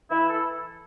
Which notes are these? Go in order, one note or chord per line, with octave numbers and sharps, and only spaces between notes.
E3 E4
A4